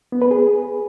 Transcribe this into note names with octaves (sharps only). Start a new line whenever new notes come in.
B3
B4
G#4